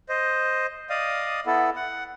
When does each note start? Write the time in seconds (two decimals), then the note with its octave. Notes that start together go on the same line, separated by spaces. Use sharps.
0.09 C5 D#5
0.90 D5 D#5 F5 D#6
1.46 B3 E4 A4
1.76 F#5